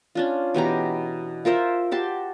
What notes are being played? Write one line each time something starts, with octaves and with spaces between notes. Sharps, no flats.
C#4 D4 F4
B2 E3 G4 A#5
F4 A#4 C5 E5
F#4 G4 A5 C6